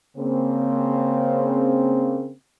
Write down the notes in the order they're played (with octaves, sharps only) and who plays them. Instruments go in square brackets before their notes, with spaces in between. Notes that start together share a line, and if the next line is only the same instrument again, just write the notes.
[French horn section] C#3 A#3 C4